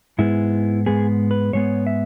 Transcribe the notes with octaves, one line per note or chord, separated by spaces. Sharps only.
G#2 G#3 B3 E4
G#2 G#3 B3 G#4
B4
G#2 G#3 B3 C#5
E5